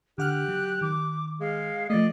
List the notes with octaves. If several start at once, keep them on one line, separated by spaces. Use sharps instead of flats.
D3 G4 F#5 F6 F#6
F#3
D#3 D6
G#3 F5
F3 A3 D5 D#5